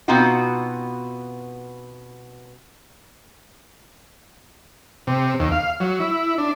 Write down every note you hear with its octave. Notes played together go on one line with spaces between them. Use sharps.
B2 B3 C4 D#4 F4 F#4
C3
D#2
F5
F#3
E4
D4